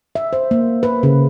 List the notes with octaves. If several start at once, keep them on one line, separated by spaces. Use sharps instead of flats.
E5
C5
A#3
B4
C#3